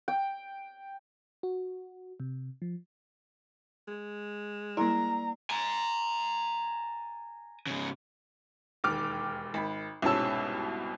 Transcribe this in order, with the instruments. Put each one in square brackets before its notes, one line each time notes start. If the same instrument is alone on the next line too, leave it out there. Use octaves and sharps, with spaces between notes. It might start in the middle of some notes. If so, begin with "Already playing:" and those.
[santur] G5
[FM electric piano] F#4
C3
F3
[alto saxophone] G#3
[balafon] G3 E4 [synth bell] A#3 D5 [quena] A#5
[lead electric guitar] G#5 A#5
G#2 C#3
[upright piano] E1 D#2 D6 F6
G#1 B5
C2 G#2 B2 C#4 A5 E6